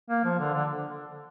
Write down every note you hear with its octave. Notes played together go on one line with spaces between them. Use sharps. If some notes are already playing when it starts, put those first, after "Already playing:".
A#3
F3
D3
D3